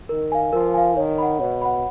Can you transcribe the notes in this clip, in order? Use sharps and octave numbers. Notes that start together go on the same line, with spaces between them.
D#3 A#4
F5 G#5
F3 A#4
F5 G#5
D#3 C#5
F#5 B5
B2 C#5
F#5 B5